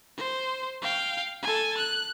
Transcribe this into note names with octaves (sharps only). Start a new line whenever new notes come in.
C5
F5 G5
A4 G#5
F#6